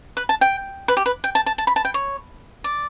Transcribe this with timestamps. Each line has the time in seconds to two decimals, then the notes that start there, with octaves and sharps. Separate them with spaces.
0.17 B4
0.29 A5
0.41 G5
0.88 B4
0.97 G4
1.06 B4
1.24 G5
1.35 A5
1.46 A5
1.58 A5
1.67 B5
1.76 A5
1.85 G5
1.94 C#5
2.64 D5